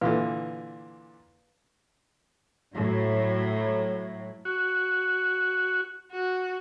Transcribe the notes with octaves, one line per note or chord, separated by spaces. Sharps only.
A#2 D3 E3 B4 F5
A2 F#3
F#4
F#4